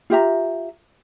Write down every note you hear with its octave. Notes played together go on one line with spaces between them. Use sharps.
F4 G4 E5 A#5